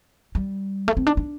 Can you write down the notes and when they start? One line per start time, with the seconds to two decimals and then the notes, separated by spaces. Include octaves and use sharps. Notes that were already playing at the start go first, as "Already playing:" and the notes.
0.35 G3
0.88 A3
0.97 C4
1.07 D4
1.17 D4